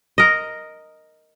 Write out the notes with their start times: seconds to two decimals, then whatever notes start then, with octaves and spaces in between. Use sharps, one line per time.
0.18 A#4 D#5